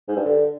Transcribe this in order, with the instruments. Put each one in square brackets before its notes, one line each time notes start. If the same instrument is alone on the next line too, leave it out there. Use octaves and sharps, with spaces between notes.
[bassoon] G#2
G2
D3